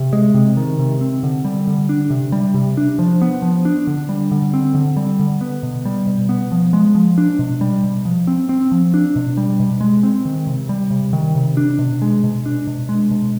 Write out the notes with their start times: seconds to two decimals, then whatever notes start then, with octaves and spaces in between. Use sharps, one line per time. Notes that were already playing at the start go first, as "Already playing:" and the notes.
Already playing: C3
0.13 G#3
0.34 C3
0.57 D#3
0.79 C3
1.01 C4
1.23 D3
1.45 G3
1.67 D3
1.89 D4
2.10 C3
2.32 G3
2.54 C3
2.77 D4
2.99 F3
3.22 B3
3.42 F3
3.65 D4
3.87 D3
4.09 G3
4.31 D3
4.54 C4
4.74 D3
4.97 G3
5.19 D3
5.41 B3
5.63 B2
5.85 G3
6.07 B2
6.29 B3
6.52 F3
6.73 G#3
6.95 F3
7.18 D4
7.39 B2
7.61 G3
7.84 B2
8.05 F3
8.27 C4
8.49 C4
8.72 F3
8.94 D4
9.16 B2
9.37 G3
9.60 B2
9.81 G#3
10.03 C4
10.25 D#3
10.47 C3
10.69 G3
10.91 C3
11.13 D#3
11.35 C3
11.57 D4
11.79 B2
12.02 G#3
12.24 B2
12.46 D4
12.67 B2
12.89 G#3
13.11 B2